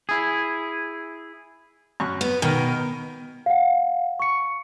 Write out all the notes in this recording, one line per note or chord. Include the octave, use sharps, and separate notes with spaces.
E4 G#4
F#2 C#6 F#6
B3
B2 D#3 A#4
F5 F#5
C#6 C#7